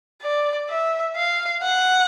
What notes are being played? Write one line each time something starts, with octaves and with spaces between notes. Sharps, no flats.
D5
E5
F5
F#5